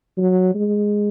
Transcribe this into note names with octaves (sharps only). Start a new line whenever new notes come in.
F#3
G#3